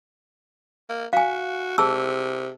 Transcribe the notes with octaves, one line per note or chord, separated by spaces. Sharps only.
A#3
F#4 F5 G#5
C3 G#4 A5 E6